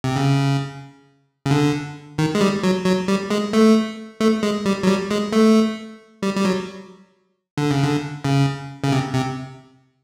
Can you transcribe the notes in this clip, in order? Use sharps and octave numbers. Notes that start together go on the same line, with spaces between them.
C3
C#3
C#3
D3
D#3
G#3
G3
F#3
F#3
G3
G#3
A3
A3
G#3
G3
F#3
G3
G#3
A3
G3
G3
F#3
D3
C#3
D3
C#3
C#3
C3
C3